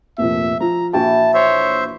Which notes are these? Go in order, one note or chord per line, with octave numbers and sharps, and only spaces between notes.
F1 A#2 F3 E5
F3 A#5
A#1 E3 F#4 G5 A5
C5 C#5 E5